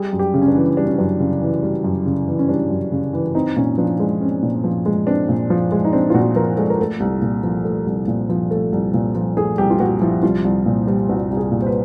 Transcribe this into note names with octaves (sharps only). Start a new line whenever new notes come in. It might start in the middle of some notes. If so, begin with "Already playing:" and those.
Already playing: G3 G#4
F#2
G4
C#3
C#4
D4
E3
G3 D4
C#4
F#2 D4
C#3
E3
G3
F#2
C#3
E3
C#4
G3 D4
F#2
C#3
E3
C4 D#4
A#2 C#4
F3 D4
G#3
C4 C#4
A#2
F3
G#3
C4 D4
A#2
F3
G#3
D#4
C4 D4
F4
A#2 F#4
F3 A#4
G#3 A4
A#4
A3 A4
C2
A#2
F3
A3
C2
A#2
F3
A3 A4
C2
A#2
F3
A3 G#4
C2 G4
F4
A#2 F#4
F3 E4
C2 F4
C2
A#2
G3
C2 F#4
C2
G#4
A#2
C5
B4